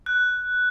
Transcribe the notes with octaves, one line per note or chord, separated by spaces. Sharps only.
F#6